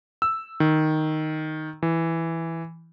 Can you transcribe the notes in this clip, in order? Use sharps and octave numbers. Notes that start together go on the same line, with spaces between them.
E6
D#3
E3